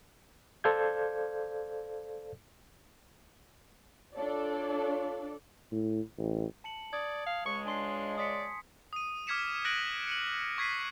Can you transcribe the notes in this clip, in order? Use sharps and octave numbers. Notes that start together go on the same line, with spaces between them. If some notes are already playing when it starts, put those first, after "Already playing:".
A4 C5 D5 F5 G6 G#6
D4 F4 A4 C#5 D5
A2
A1
A5 C#7 F#7
D5 D#6 G#6
F5
C#2 C#3 G#3 C#6
D4 G#5 C6 C7
D5 D#6 B6 C#7
D#6 D#7
D6 F6 G#6 B6 C#7 E7
F#6 A#6 D7 D#7 F#7
C#7 D#7 F#7
C#6 G#6 B6 C7 D#7